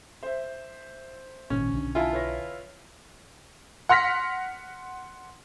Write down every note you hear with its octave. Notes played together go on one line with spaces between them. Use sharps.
C5 E5
G#1 A#2 D#3 C#4
B1 D3 D4
E4 F4 G#5 A5
B4 C#5 A#6
F#5 C6 F6 A#6 B6